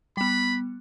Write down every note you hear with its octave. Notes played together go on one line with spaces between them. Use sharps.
G3 B3 B5